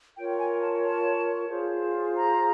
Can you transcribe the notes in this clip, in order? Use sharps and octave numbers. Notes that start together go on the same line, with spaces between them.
F4 A#4 C#5 G5
G#5
A5
A5
F4 G#4 C5
A#5